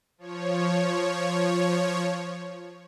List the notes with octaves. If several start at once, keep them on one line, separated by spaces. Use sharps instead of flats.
F3 C#5